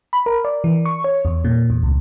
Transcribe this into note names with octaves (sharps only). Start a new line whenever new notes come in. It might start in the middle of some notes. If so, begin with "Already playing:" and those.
B5
A#4
D5
E3
C#6
C#5
E2
A#2
E2
C#2